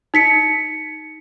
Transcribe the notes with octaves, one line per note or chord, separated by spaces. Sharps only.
D#4 B6 C#7